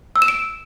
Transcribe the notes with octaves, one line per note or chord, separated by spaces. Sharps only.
E6
E7
D7